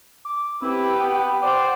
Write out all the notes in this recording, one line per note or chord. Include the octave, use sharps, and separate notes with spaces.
D6
C4 E4 G4 B4
B3 G5
C5 D5 F#5